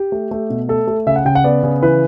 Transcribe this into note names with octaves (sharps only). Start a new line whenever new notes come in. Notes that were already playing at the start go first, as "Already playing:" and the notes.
Already playing: G4
A3
A3
B2
A3 A4
A3
C#3 E5
F#5
C#3 G5
F#5
B3 D5
C#3
E3 B4